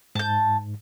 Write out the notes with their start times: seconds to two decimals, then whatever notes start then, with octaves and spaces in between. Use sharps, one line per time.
0.15 G#2 A5 G6